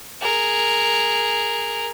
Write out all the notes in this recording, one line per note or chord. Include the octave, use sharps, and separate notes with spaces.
G#4 A#4